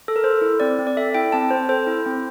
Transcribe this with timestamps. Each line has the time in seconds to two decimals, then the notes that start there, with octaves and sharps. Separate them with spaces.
0.08 A4
0.16 A#4
0.24 A4 C5
0.41 E4
0.60 C4 D5
0.79 C4
0.87 D5
0.97 A4 E5
1.15 E4 G5
1.32 C4 A5
1.50 C4 C5
1.69 A4 C5
1.87 E4
2.06 C4